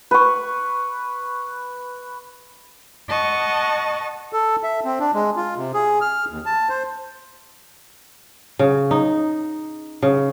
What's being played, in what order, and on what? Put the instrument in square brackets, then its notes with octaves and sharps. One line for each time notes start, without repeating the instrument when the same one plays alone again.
[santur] B4 C#6
[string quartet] D#5 F#5 A5 C#6
[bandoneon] A4
E5
C4
D4
G#3
F4
C3
G#4
F6
D#2
A5
C5
[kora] C#3
D#4
C#3